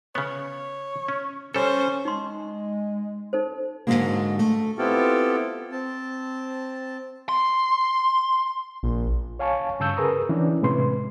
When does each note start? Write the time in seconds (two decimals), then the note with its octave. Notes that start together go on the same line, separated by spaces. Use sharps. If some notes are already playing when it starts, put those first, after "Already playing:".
0.15 C#3 B3 C#5
1.08 C#4
1.54 G3 C#4 A4 C5 C#6
2.05 G#3 D#4 C6
3.33 D#4 A4 C5
3.87 G#2 B2 D3 F#3 G#3 A#3
4.39 A3
4.78 B3 C4 E4 F4 G4 A4
5.72 C4 A5
7.29 C6
8.83 A#1
9.39 C#5 F5 G#5 A5 C#6
9.80 G2 C#3 A5 C#6 E6 G6
9.97 G#4 A#4 B4 A#5 D#6
10.29 E3 C#4 D4 D5
10.62 A2 C3 G#3 B4 C6